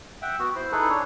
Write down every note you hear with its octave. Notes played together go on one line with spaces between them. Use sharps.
E5 F#5 G5
B3 F#4
E4 C5
D#4 E4 G#4 A4 B4
D4 C#5